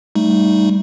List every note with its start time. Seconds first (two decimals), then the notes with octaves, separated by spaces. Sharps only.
0.15 G3 A3 D#4